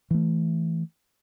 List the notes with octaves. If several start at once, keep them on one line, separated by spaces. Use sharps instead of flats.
E3 A3